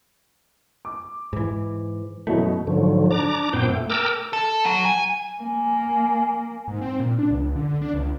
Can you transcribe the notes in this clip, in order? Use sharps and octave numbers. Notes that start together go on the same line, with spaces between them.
D6
G#2 E3
F#2 B2 E3 A3
G#2 D3 F3 F#3
D4 A#5 D6
F#2 A#2 B3 C5 G5
A3
A#4 G5 A5 A#5 D6 E6
A4
F#3
G#5
A#3 G#5
G#2
C4
A#2
D4
C#2
D3
D4
C#2